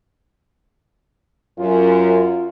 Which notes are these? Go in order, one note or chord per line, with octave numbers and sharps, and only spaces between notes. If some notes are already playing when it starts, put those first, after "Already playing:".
F#2 F4